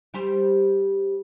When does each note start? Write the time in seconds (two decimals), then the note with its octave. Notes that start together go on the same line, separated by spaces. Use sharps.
0.14 G3 G4 C5